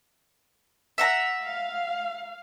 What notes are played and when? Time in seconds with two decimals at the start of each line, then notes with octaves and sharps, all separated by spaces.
0.98 E5 F#5 A#5
1.43 F5